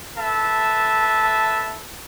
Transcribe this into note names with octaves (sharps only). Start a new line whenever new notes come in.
A4 B4 E5 A5